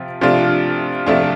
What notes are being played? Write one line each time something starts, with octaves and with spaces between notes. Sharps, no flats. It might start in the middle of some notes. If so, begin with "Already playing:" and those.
Already playing: C3 F3 F4
C3 F3 A3 D4 F4
C3 F3 A3 D4 F4